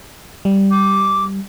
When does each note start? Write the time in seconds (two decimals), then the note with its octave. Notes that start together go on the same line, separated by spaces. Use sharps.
0.45 G3
0.71 D6